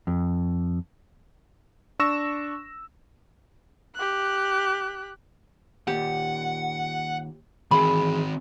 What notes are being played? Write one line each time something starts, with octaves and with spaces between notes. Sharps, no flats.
F2
D4 C#6 E6 A#6 E7
G4 F#6
D#2 A#2 G4 F#5
D#3 E3 C4 G#4 B5 C6